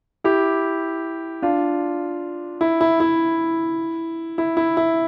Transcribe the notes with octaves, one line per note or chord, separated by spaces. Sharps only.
E4 G4
D4 F4
E4
E4
E4
E4
E4
E4